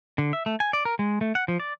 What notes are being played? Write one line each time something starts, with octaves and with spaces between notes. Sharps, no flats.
D3
E5
A3
G#5
D5
A#4
G#3
A3
F#5
F3
D5